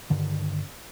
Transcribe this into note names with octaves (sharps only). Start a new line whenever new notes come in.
G2 D3 D#3